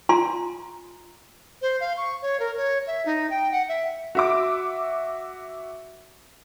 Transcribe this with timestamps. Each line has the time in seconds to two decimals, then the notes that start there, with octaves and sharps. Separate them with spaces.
0.09 F4 G#5 A#5 C6
1.62 C5
1.80 F5
1.97 C#6
2.22 C#5
2.40 A#4
2.57 C#5
2.87 E5
3.06 D#4
3.30 G5
3.52 F#5
3.69 E5
4.15 F#4 E5 D6